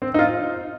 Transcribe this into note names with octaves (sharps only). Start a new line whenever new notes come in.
C4
D#4
F4